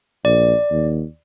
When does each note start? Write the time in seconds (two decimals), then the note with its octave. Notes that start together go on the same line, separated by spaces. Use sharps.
0.25 A#1 D5
0.71 D#2